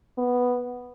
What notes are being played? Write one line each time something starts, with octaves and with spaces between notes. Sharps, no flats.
B3